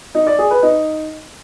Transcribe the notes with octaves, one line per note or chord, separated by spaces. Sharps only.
D#4
D5
G#4
B4
D#4